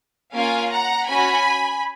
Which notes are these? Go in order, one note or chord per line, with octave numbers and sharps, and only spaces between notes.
A#3 C#4 F4 F5 G#5
F#5 A#5
C#4 F#4 G#5 B5